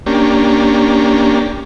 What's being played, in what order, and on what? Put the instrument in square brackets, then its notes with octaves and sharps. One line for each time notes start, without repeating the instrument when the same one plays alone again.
[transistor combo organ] A#3 C#4 D4 G4